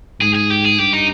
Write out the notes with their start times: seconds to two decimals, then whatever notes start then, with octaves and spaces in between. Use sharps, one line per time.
0.20 G#2 G#4
0.35 G#4
0.50 G4
0.65 G#4
0.78 G2 G4
0.93 D#4